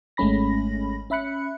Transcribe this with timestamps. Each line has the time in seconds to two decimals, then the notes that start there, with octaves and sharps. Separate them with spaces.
0.17 G#1 G#3 A3 C#4 B5 A#6
1.10 C#4 E5 B5 F#6 C#7